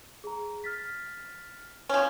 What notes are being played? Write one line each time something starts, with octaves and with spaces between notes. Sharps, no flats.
G#4 A#5
F6 A6 B6
F3 C#4